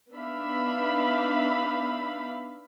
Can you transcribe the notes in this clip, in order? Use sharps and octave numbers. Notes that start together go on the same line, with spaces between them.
B3 D4 D#4 E5 F5 B5